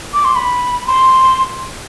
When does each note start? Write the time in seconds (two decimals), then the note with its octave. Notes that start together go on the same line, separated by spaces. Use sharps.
0.14 D6
0.25 C6
0.36 B5
0.87 C6